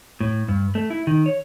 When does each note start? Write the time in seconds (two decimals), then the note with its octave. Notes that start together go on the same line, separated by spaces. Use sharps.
0.21 A2
0.48 G2
0.75 A3
0.90 E4
1.07 D#3
1.26 C#5